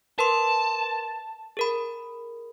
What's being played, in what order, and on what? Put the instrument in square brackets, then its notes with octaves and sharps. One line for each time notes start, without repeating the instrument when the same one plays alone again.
[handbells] A#4 B4 C6 [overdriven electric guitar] A5
[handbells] G#4 A#4 B5